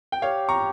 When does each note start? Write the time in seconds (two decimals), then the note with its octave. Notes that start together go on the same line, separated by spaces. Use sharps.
0.12 G5
0.22 G4 C#5 F5
0.49 A#5 C#6